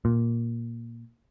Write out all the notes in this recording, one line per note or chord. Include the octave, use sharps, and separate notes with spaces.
A#2